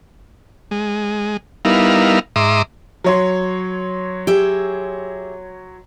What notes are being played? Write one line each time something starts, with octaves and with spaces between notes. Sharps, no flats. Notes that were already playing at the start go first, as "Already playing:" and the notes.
G#3
G3 B3 D#4 E4 A#4 F5
G#2 E5 A#5 C6 D6 D#6
F#3 C#5 C6
G4 G#4 E5